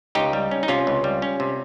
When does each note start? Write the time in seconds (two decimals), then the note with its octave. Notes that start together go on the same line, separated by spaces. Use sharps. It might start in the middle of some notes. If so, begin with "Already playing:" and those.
0.15 C#2 D#4 G4
0.33 G3
0.51 C#4
0.63 D#4
0.68 C3 C#4 F4
0.87 C#2
1.04 G3
1.22 C#4
1.40 C3